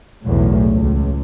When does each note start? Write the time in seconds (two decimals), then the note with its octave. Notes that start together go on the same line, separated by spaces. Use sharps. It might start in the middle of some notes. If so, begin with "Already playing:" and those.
0.24 B1 E2 A2
0.70 C#2